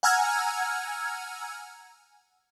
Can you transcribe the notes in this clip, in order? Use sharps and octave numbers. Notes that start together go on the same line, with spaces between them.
F#5 G#5 A#5 E6 F6 G#6